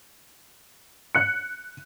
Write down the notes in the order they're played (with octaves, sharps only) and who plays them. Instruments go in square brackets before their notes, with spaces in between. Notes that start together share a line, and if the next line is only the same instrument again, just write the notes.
[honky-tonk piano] F#6 C#7